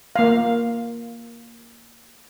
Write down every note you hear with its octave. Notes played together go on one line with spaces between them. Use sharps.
A#3 F5